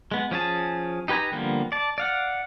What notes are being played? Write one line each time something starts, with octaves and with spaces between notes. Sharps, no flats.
G#3 B3
F3 C#4 G#4 A5
D#4 G4 B4 G#5 A#5
D3 F3 G3 A#3 B3
D5 A5
D5 F5 F#5